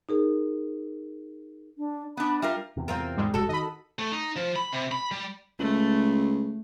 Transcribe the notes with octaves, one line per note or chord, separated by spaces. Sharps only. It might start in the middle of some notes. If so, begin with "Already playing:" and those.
D#4 G#4 A#4
D4
B3 D4 B5
G3 F4 A#4 E5
E2 C3
C4 F4 A#4
G#2 G3 G#3
F1 F#4 A4
D#3 D#5 B5
A3
D#4
F3
B5
C3
B5
G3
C#2 A3